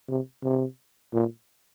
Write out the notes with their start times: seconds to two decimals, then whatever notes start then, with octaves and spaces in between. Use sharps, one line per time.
0.09 C3
0.43 C3
1.14 A#2